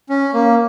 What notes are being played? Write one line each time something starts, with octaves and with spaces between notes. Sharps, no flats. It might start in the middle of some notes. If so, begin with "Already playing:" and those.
C#4
A#3